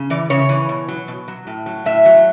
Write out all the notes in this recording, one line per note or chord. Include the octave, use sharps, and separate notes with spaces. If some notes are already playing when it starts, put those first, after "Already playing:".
Already playing: C#3
E3 D5
C#3 C#5
E3
B2
F#3
B2
F#3
A2
F#3
A2 E5
F#3